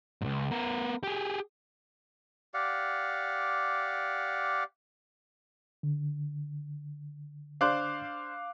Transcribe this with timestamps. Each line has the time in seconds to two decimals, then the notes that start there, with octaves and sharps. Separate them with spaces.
0.21 C#2 G#2
0.51 B3 A#4
1.03 G4 G#4
2.54 G4 D5 F5 F#5
5.83 D3
7.61 D4 C5 F5 D6 F#6